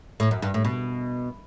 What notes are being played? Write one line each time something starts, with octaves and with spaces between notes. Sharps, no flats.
A2
F#2
G2
A2
B2